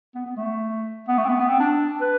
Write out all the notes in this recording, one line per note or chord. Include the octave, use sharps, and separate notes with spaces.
B3
B3
A3
B3
A3
C4
B3
B3
C4
D4
B4